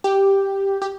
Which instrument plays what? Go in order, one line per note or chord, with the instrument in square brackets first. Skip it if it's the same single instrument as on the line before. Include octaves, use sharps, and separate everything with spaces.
[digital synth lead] G4
G4